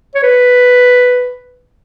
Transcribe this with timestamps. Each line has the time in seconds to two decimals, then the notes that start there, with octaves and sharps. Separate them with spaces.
0.15 C#5
0.23 B4